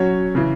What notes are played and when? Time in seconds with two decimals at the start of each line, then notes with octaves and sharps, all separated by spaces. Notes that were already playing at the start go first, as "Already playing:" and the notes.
Already playing: F#3 C#4 F#4 C#5
0.35 C#3 E3